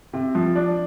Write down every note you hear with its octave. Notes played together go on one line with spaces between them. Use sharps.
C3
F3
D4